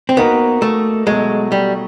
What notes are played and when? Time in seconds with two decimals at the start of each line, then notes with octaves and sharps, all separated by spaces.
0.09 C4
0.17 A#3 B3 D#4 F#4 A#4
0.62 A3
1.07 B2 F#3 G#3 A3
1.52 G3